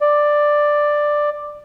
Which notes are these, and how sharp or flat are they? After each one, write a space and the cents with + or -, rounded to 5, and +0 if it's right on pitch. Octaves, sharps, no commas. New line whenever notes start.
D5 +10